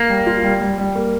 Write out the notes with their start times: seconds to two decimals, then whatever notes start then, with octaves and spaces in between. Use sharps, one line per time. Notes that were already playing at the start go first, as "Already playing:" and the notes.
Already playing: A#3
0.10 G3
0.26 F4
0.43 G3
0.61 G3
0.78 G3
0.96 A#3